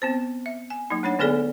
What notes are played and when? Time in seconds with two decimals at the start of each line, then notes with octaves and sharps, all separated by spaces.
0.02 B3 C4 C5
0.46 E5
0.70 G#5
0.90 F#3 A#3 D#4
1.03 A3 D4 C#5 F#5
1.19 D3 B3 G#4 A4 D5 G#5